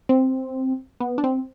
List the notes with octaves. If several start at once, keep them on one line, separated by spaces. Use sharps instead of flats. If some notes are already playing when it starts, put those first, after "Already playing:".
C4
B3
D4
C4